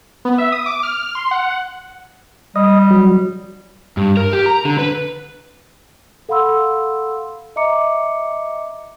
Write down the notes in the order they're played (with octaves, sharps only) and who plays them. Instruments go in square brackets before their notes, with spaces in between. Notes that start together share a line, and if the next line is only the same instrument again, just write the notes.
[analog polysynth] B3
E5
D#6
D6
F6
C6
F#5
[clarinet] G3 [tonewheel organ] D#5
[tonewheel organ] F#3
[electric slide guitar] G2
A#4
G4
A#5
D3
B4
[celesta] A4 F5 F#5 B5 C6 E6
D#5 E5 A#5 D6 C#7